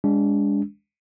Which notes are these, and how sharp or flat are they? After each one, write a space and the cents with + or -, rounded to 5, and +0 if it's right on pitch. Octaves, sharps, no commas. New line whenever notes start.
G#3 -25 D4 -35